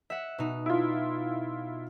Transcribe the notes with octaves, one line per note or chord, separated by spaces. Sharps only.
E5 F#5
B2 D#4
E4 F4